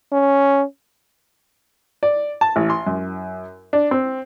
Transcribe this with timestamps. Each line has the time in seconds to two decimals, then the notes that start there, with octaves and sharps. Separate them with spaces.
0.12 C#4
2.03 D5
2.41 A5
2.56 A1
2.70 C6
2.87 F#2
3.73 D4
3.91 C4